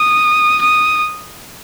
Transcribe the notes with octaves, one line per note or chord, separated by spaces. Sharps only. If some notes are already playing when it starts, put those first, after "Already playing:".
Already playing: D#6
D#6